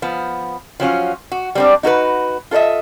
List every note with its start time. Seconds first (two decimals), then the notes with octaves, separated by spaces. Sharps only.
0.02 F3 B3
0.80 F3 F#3 C#4 F4
1.32 F#4
1.55 G3 C4 D4
1.83 D#4 F#4 A#4 B4
2.51 F4 A4 C5 D#5 E5